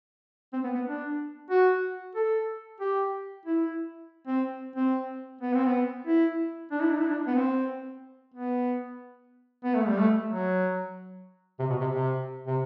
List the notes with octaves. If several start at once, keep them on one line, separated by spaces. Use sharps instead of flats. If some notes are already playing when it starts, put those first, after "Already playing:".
C4
B3
B3
D4
F#4
A4
G4
E4
C4
C4
B3
C4
B3
E4
D4
E4
D4
E4
D4
B3
C4
B3
B3
A3
G3
A3
F#3
C3
B2
C3
C3
C3